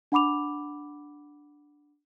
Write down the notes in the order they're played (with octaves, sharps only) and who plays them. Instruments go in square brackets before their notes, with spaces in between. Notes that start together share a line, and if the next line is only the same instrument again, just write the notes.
[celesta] D4 F#5 B5 D6 F7